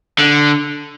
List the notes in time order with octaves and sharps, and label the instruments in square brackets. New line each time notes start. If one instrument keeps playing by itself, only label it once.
[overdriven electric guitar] D3